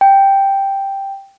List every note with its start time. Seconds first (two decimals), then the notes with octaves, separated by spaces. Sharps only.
0.01 G5